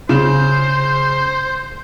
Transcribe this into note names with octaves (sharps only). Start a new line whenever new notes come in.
C#3 C5